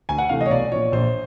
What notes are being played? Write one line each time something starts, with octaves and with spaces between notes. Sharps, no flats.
D2 G#5
F#5
C3 E3 A3 F5
D#5
C#5
B1 D5
A#2 F3 C#5
A#1 C5